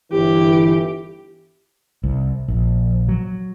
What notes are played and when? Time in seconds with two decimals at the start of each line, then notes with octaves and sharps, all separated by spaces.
0.12 G1 E3 G4
2.04 C2
2.48 A#1
3.09 F#3